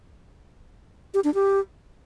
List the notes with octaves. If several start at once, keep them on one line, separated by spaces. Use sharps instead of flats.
G4
D4
G4